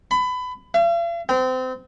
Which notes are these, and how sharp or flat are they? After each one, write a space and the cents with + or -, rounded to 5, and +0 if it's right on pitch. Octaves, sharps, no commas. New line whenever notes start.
B5 +25
F5 -45
C4 -30